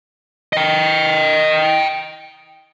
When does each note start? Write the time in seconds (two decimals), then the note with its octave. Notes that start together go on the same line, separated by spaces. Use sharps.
0.53 D#5 G5